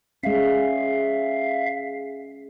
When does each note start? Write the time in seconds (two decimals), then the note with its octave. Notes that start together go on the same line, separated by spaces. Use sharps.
0.23 G#3 C#4 E5 F5